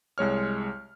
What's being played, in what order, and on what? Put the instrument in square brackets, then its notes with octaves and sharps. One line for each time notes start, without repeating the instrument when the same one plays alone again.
[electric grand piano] C2 G#3 C#5 F6